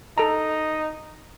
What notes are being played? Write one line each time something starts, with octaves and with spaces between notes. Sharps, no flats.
D#4 A4 A#5